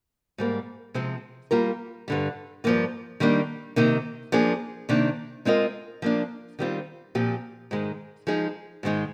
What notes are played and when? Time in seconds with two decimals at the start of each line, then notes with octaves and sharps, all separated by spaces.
0.38 G#2 G3 A#3
0.94 C3 F3 G#3 C4
1.51 G3 A#3 F4 A#4
2.08 G2 D3 G3
2.64 G2 F3 A#3 F4
3.20 D#3 G3 A#3 D4
3.76 C3 D#3 A#3 D#4
4.32 F3 A#3 D4 G#4
4.89 C3 D#3 A#3 D4
5.45 G#3 C4 F4 A#4 D#5
6.02 F3 A#3 D4
6.59 D#3 G3 C4 F4
7.15 A#2 F3 C4 G4
7.71 G#2 D#3 G#3
8.27 F3 G#3 D#4 G#4
8.83 G#2 D#3 G#3 D#4